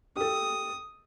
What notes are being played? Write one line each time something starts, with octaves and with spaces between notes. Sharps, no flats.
G4 A4 D#6